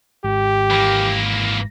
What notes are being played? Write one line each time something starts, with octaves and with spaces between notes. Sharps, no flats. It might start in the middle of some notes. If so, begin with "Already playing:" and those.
G#1 G4
E3 A#3